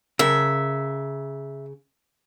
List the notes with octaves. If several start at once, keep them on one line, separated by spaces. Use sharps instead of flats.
C#3 A#4 E5